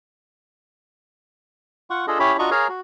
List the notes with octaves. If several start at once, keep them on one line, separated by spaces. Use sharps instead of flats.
F4 F#5 C#6
D4 F4 G#4 A4 D#5
C#4 E4 G4 C#5 B5
D4 F4 F#4 D#5 A#5 C#6
G#4 A#4 C#5 F5 G#5 A#5
F#4